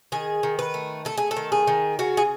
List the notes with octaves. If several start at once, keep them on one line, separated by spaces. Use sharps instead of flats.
D#3 G#4
D#3
B4
A3
A3 A4
G#4
A4
D#3
G#4
D#3
C#3 F#4
G#4